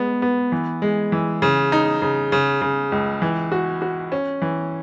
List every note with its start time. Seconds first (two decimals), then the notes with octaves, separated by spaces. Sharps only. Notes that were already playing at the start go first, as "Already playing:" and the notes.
Already playing: G#3 B3
0.22 B3
0.52 E3
0.82 G#3
1.12 E3
1.42 C#3
1.72 D#4
2.02 C#3
2.32 C#3
2.62 C#3
2.92 C#2
3.22 E3
3.52 F#4
3.82 F#4
4.12 C#4
4.42 E3